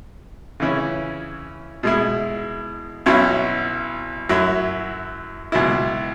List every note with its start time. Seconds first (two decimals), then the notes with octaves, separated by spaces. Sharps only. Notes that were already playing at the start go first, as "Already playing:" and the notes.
0.60 C#3 E3 C#4 E4
1.83 B2 G#3 E4
3.06 B1 B2 F#3 C#4 E4
4.29 F#2 F#3 E4
5.52 C#2 B2 F#3 E4